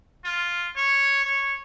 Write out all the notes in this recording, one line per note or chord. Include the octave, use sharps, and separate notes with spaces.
F4
C#5
C#5